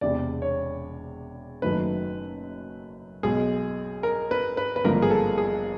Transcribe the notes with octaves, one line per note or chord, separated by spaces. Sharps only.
E1 E2 C3 D5
C#5
F#1 F#2 D#3 F#3 A3 B4
B1 B2 G#3 G#4
A#4
B4
B4
B4
G#1 G2 D3 F3 A#3 A#4
G#4
A4
G#4